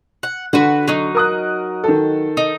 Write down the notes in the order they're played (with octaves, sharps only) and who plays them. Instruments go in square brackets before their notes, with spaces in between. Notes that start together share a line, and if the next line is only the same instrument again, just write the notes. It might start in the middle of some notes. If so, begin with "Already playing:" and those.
[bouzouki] F#5
[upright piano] D3 [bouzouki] F#4 B4 F#5
[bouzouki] F#3 D#4
[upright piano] A#4 D#6 F#6
D#3 A4
[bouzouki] D#4